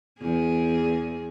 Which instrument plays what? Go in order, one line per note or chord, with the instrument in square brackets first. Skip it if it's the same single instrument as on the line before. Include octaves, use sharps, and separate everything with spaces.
[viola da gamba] E2 G#4